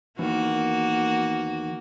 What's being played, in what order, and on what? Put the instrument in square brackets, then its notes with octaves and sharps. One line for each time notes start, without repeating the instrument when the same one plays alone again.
[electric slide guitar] E2 D#3 [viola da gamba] A#3 F#4